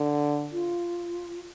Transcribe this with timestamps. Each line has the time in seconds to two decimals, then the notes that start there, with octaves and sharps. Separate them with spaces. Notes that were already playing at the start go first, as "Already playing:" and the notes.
Already playing: D3
0.52 F4